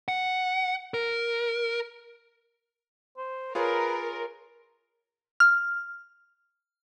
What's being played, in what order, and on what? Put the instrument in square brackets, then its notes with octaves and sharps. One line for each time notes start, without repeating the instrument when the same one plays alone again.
[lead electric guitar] F#5
A#4
[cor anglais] C5
[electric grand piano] F4 G#4 C#5 [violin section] A#4 [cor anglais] B4
[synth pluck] F6